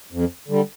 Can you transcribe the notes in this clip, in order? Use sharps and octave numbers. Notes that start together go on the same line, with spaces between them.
F2
D3 G3